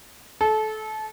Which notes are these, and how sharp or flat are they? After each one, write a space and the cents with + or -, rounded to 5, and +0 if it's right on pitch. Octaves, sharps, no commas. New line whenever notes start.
A4 -25